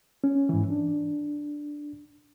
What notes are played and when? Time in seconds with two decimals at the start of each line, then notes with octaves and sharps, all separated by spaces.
0.24 C#4
0.49 G#2 E3
0.70 D4